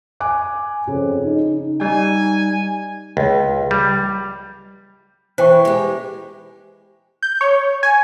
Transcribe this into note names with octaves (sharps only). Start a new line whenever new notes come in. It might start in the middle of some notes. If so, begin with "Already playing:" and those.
G#5 D6 F#6
F2 C#3
D#4
G3 D#4 G#5
C#2
G3
E3 C5 G5 C#6
G#3 G4
G6
C#5
G#5